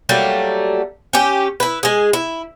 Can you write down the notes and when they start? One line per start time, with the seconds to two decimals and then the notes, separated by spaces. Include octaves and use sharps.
0.09 F#3 G3 A3 A#3
1.13 C#4 G4
1.60 E4 B4
1.83 G#3 G#4
2.13 E4